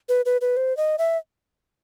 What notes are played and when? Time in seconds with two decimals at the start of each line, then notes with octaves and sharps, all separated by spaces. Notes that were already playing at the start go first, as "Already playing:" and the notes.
0.09 B4
0.26 B4
0.41 B4
0.57 C5
0.77 D#5
0.98 E5